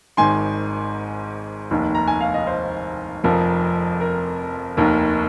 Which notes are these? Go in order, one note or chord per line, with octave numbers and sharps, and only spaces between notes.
G#1 G#2 D#3 G#5 C6
F1 D#2 D#3
A#5
G#5
F5
D#5
C5
F1 F2 F3 A#4
A#4
F1 D#2 D#3 A#4